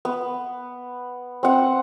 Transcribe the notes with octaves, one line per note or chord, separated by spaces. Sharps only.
B3
C4 F#5